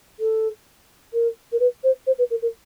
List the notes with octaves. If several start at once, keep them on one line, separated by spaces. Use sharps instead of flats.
A4
A#4
A#4
B4
C5
C5
B4
A#4
A#4